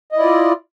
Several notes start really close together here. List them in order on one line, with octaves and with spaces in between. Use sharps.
D#5 E4 D5 F4